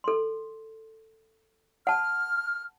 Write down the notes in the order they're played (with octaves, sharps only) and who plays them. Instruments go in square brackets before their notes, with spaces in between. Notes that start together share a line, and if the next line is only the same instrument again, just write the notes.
[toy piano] A4 C6
[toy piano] F#5 A5 [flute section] F6